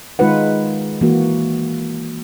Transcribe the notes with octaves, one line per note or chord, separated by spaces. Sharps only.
D#3 G#3 D#4 F4 B4 F#5
E3 A#3 F#4